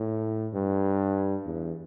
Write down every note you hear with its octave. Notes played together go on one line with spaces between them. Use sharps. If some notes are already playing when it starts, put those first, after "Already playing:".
Already playing: A2
G2
E2